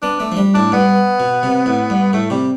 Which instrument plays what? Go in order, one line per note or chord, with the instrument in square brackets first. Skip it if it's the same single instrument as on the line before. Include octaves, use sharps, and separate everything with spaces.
[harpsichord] B3 [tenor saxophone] D4
[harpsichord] A3 [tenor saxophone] D4
[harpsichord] F3
G3
[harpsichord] A2 [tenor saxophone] D4
[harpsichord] G2 [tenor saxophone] B3
[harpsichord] B2
C3
A2
G2
[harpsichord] A2 [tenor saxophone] A3
[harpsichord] C3 [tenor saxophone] G3